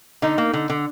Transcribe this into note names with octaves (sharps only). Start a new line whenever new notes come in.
D3 D#4
A#3
D3
D3